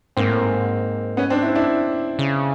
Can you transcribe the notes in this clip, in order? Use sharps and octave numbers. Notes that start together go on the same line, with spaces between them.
G#2 A#3 C4
A2
G#2
B3 C#4
C4 D4
D4 E4
D4 E4
C#3